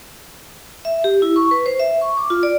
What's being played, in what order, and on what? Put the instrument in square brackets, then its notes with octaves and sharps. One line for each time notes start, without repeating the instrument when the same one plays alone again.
[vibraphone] E5
G4
E4
C#6
B4
C5
E5
C#6
D6
F4
D5